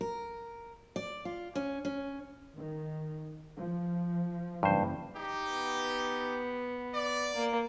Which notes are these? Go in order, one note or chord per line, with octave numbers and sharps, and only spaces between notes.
A#4
D5
F4
C#4
C#4
D#3
F3
F#1 G2 E3 C5
D#4 G4
B3
D5
A#3